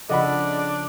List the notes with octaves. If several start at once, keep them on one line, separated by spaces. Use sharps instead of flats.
C#3 F3 D4 A4 D5 D#5 F#5 B5